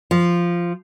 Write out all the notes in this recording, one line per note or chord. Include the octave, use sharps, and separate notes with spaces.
F3